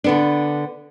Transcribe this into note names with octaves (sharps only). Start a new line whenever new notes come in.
D3 B3 D4